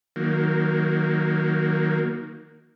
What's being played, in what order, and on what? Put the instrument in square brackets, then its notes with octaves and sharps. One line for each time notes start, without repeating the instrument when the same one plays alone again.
[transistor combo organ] D#3 F#3 A#3